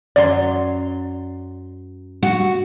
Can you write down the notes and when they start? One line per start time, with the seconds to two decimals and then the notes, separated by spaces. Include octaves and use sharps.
0.16 F#2 F#3 D5 C6
2.23 F#4